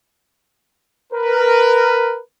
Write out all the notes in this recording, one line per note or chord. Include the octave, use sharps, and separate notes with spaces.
A#4 B4